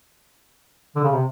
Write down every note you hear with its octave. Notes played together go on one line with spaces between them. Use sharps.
D3
C#3
C3